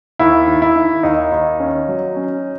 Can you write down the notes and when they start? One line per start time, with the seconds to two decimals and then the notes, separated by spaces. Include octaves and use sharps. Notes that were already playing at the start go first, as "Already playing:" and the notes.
0.19 D#2 E4
0.47 D#3
0.62 E4
0.76 D#3
1.03 D#2 D#4
1.32 D#2
1.60 C#4
1.89 F#3
2.16 C#4